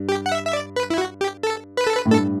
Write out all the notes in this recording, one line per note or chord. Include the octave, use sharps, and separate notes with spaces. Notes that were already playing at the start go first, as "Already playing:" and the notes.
Already playing: G2
G4
F#5
E5
E5
D5
B4
E4
F#4
G4
A4
B4
A4
B4
A2
G2 A4